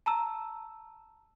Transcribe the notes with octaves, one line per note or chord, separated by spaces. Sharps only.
A5 A#5 E6